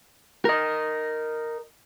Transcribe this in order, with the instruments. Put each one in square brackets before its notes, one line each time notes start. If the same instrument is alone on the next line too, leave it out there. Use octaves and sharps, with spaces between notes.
[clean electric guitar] A#4 D#5